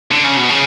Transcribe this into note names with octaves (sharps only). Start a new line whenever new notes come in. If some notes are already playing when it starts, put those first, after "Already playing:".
D3
C#3
B2
C#3